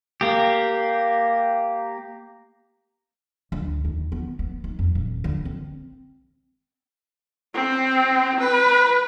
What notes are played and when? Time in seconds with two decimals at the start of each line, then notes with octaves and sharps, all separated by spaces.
0.21 A#3 G4
3.52 D2
3.85 D#2
4.12 B3
4.39 B3
4.64 D#4
4.79 F2
4.95 D#1
5.24 D3
5.45 C4
7.54 C4
8.40 B4